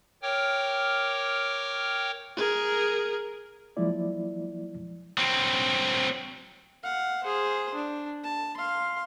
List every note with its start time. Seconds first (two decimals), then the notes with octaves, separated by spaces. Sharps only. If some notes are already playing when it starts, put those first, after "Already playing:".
0.22 A#4 C#5 G5 D6 F6
2.37 G#4 A#4
3.77 F3 F#3 G#3 A#3 E4 D5
5.18 F#3 C4
6.83 F5 F#5
7.24 G#4 C5
7.74 D4
8.24 A5
8.57 F5 C6